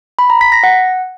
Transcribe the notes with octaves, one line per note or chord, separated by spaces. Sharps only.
B5
A#5
B6
A#6
F#5